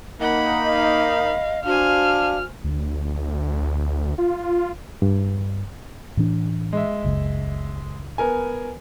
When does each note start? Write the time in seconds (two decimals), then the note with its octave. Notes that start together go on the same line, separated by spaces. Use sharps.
0.21 A#3 D#4 D#5 F#5 B5
0.70 F5
1.66 D4 F#4 C5 F5 G#5 F6
2.64 D2
4.18 F4
5.02 G2
6.17 A2 E3 D4
6.73 G#3 E5
7.04 F#1 C#2
8.18 B3 A#4 G#5